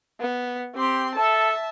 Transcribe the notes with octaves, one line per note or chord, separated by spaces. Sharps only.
B3
C4 G4 C6
A4 E5 A5